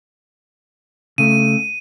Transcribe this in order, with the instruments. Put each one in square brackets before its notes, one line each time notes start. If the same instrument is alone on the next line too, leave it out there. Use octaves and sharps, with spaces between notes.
[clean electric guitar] C#3 A3 [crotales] D#7